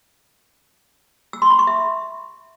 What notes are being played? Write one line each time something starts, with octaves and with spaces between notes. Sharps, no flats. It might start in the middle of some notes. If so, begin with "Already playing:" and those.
E6
C6
B5
C#6
E5